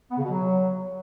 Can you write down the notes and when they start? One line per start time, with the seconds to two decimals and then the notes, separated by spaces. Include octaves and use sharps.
0.11 B3
0.18 C#3
0.24 B2
0.31 F#3